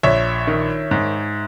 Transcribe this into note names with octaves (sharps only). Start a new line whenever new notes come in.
A#1 C#5 E5
D#3
G#2